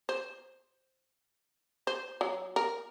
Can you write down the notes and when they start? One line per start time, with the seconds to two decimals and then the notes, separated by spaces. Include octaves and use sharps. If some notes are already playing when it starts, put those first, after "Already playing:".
0.09 C5
1.87 C5
2.21 F#3
2.56 A#4